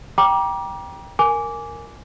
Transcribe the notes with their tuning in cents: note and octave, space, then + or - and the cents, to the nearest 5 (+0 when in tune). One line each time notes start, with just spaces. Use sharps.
G5 +0 A#5 +35 D6 +0
A#4 -5 G#5 +0 D6 -15